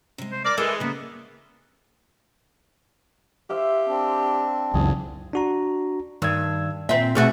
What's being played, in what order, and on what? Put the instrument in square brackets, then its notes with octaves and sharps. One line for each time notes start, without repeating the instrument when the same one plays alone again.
[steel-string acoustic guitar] C3 G#3
[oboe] C5
[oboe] A#4 [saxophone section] D5
[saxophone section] E3 G#3 [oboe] A4 [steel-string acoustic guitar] A#4 A5
[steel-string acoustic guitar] C#3 A#3 [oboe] B3
[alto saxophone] G4 [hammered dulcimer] C5 E5 F5
[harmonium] C4 D4
[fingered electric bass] C#2 F#2 [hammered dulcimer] G#4
[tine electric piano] D4 F#4 A#5
[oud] G2 [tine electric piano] D#3 E6 G#6
[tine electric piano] A#2 [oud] C4 E5
[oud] B2 A3 F#4 [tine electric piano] C4 G#4